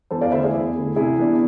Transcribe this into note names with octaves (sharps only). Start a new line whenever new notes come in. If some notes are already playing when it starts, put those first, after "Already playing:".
E2 A4 C5
D5 F5
D3 A3 C5 E5
E4 G#4
E2
D3 A3
C3 E4 G#4
E3 B3 D4